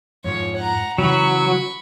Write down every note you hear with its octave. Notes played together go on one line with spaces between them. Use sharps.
F2 G#2 F3 C#5
F#5 A#5
C#3 E3 F#3 B5 C#6